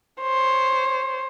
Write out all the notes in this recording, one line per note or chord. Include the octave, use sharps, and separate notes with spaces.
C5 C#5